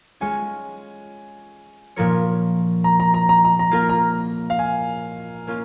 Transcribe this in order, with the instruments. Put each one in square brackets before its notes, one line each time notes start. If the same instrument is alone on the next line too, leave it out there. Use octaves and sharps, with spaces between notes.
[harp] G#3 C#4 F4 C#5 [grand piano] G#5
[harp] A#2 F3 C#4 A#4 C#5
[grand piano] A#5
A#5
A#5
A#5
A#5
A#5
[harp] A#3 F4 A#4 [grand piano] A#5
[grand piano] A#5
F5
G#5
[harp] A#3 C#4 F4